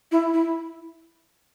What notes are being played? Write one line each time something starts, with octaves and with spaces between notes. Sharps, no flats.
E4
E4